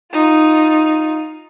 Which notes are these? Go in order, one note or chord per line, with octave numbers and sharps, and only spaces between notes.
D#4 F4